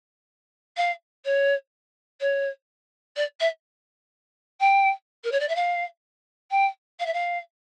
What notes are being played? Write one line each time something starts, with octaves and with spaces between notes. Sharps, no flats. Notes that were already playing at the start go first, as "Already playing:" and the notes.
F5
C#5
C#5
D5
E5
G5
A#4
C#5
D5
E5
F5
G5
F5
E5
F5